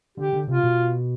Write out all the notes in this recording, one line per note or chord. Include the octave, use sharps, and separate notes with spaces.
D3 G4
D3
C3 F4
B2